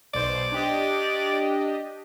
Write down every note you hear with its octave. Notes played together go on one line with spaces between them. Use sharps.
B1 C5 D5
D4 G4 D#5